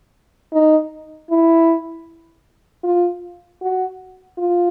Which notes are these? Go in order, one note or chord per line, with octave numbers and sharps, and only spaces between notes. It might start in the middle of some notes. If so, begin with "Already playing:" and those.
D#4
E4
F4
F#4
F4